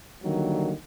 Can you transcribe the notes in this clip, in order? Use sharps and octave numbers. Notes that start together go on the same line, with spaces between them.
D3 D#3 F#3 G3 A#3